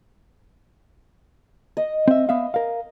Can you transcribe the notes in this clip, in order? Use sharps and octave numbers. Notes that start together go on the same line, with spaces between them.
D#5
C4 E5
B3 E5 F5
A#4 F5